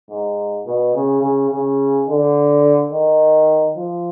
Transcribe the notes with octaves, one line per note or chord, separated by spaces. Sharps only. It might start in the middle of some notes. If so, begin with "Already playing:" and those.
G#2
B2
C#3
C#3
C#3
D3
D#3
F3